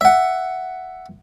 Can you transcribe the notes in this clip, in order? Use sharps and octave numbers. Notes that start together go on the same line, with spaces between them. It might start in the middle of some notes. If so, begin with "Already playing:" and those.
E5 F#5